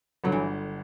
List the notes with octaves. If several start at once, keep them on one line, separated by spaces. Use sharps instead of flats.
G1 D3 F#3
E3